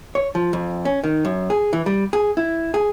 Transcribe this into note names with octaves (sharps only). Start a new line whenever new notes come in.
C#5
F3
F2
C#4
D#3
F#2
G#4
E3
G3
G#4
E4
G#4